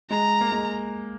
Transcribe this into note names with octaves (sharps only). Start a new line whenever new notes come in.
G#3 A#5
A#3
G#3